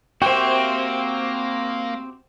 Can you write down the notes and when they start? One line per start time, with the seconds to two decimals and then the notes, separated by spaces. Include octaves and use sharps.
0.22 A#3 C4 F#4 G4 C5 E5 G5